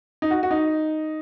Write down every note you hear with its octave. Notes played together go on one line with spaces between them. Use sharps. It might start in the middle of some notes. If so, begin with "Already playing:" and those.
D#4
F#4
F#4
D#4